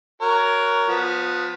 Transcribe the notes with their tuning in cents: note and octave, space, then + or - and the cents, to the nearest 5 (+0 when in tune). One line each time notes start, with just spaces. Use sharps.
F#4 +0 A#4 +0 C#5 +20
F3 +30 B3 +0